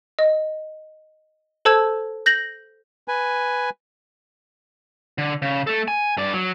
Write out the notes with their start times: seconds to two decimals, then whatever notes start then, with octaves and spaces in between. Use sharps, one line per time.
0.19 D#5
1.65 A4 C5 A5 E6 G#6
2.26 G6 A#6 F#7
3.08 B4 G#5
5.18 D3
5.42 C#3
5.67 A3 A4
5.88 G#5
6.17 G2 D5
6.34 F#3